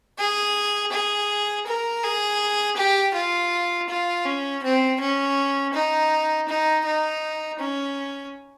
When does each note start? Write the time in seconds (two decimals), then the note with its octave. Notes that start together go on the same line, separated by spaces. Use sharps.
0.18 G#4
0.92 G#4
1.67 A#4
2.03 G#4
2.77 G4
3.15 F4
3.89 F4
4.25 C#4
4.63 C4
5.00 C#4
5.73 D#4
6.48 D#4
6.85 D#4
7.59 C#4